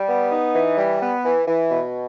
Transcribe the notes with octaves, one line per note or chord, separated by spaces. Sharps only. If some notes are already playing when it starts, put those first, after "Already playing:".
Already playing: G3
B3
D#4
E3
G3
B3
E3
E3
B2